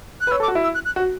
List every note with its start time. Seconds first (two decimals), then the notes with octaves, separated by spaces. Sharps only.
0.21 F#6
0.27 B4
0.31 C#5 E6
0.40 A4 D6
0.48 F#4
0.55 E4
0.63 E6
0.75 F#6
0.85 F#6
0.96 F#4